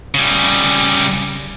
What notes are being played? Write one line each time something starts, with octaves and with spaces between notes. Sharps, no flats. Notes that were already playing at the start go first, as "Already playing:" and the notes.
C#3 G3